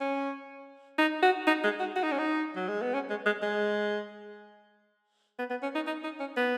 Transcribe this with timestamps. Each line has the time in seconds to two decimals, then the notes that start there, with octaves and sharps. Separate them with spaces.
0.01 C#4
0.98 D#4
1.23 F#4
1.47 D#4
1.64 G#3
1.80 F#4
1.96 F#4
2.04 D#4
2.12 C#4
2.18 D#4
2.56 F#3
2.68 G#3
2.82 B3
2.94 C#4
3.10 G#3
3.26 G#3
3.42 G#3
5.39 B3
5.50 B3
5.63 C#4
5.75 D#4
5.87 D#4
6.04 D#4
6.20 C#4
6.37 B3